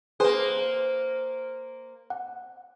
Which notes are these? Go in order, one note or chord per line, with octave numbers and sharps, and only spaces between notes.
A#3 G#4 B4 C5 G#5
F#5